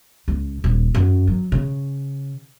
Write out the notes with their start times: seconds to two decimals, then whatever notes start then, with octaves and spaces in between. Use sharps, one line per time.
0.28 C#2
0.64 D#1
0.94 F#2
1.27 F#3
1.52 C#3